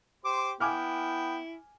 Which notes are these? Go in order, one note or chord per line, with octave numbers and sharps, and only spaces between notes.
G4 C5 C6 D6
B3 E4 G5 G#5 D6 F6